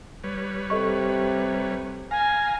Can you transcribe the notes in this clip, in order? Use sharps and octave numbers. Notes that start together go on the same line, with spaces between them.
G3 B4 C#5
C3 A4 D#5 C#6
F5 G#5 A#5